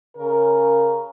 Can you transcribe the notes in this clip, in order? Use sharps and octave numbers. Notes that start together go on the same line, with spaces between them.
C#3 A#4